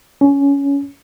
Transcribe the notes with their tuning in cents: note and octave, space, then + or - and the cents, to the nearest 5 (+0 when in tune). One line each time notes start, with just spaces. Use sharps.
C#4 +15